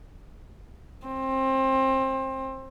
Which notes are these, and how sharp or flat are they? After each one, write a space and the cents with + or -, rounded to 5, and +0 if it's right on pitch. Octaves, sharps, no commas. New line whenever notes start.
C4 +25